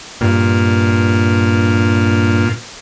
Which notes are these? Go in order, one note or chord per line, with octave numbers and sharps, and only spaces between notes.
G2 A#2